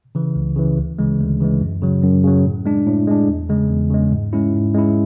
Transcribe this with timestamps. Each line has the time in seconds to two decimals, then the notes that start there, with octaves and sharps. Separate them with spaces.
0.15 C#3 E3
0.36 C#2
0.56 C#3 E3
0.78 D2
0.99 C#3 E3 G#3
1.19 D2
1.40 C#3 E3 G#3
1.61 F#2
1.82 C#3 F#3
2.03 F#2
2.24 C#3 F#3
2.45 A2
2.65 G#3 D4
2.86 A2
3.07 G#3 D4
3.29 E2
3.49 C#3 G#3
3.70 E2
3.91 C#3 G#3
4.12 G#2
4.33 G#3 C#4 E4
4.54 G#2
4.74 G#3 C#4 E4